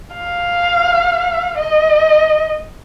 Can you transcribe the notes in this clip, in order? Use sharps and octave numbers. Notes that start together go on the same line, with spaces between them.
F5
D#5